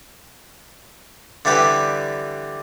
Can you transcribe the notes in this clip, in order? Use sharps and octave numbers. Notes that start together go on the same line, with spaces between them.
D3 E3 G3 G4 B4